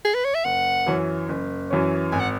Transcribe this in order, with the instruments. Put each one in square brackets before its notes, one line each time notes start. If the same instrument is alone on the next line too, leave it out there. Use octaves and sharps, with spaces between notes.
[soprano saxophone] G#4
B4
C#5
E5
[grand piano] F#1 [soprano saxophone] F#5
[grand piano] F#2 E3 C#4
F#1
F#2 E3 C#4
[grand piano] G#1 [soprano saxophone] G#5
[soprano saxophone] F#5